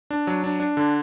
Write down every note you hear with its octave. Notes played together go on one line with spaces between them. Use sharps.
D4
F#3
D4
D4
D3